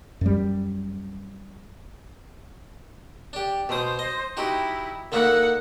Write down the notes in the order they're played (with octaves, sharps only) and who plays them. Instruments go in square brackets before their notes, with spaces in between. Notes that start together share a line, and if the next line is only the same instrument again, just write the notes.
[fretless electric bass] F#2 G3
[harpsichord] D4 G4
[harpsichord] B2 D#6 [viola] C5
[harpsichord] D#5
[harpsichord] D#4 F#4 G4 [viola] E4
[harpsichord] D3 A#3 E4 [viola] D#4 F#5